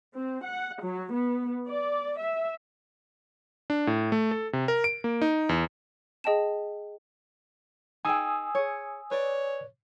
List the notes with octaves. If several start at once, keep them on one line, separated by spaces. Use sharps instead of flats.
C4
F#5
F#3
B3
D5
E5
D4
A2
A3
A4
C3
A#4
D7
A#3
D#4
E2
G#4 D#5 G5 A5 E7
D#4 G#4 G5 G#5 D#6 E6
G#4 C#5
B4 C#5 D5